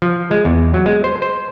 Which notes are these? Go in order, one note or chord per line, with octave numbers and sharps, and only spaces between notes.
F3
G#3
E2
F#3
G#3
C5
C5